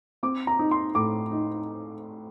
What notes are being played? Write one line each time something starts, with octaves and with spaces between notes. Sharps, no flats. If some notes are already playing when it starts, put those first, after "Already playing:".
C4 D6
A#5
D#4
C6
A2 D6
D#4